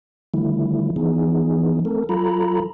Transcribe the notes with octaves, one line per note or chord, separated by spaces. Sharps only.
D3 D#3 F3 G3 A3 E4
E3 F3 B3 D#4 G#4
A3 C4 A4 A#4
F#3 F4 A4 A#5 B5